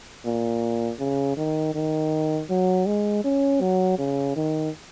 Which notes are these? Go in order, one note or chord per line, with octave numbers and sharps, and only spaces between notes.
A#2
C#3
D#3
D#3
F#3
G#3
C#4
F#3
C#3
D#3